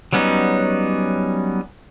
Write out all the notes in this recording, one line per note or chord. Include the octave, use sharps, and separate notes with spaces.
F#3 G3 B3 C#4 D#4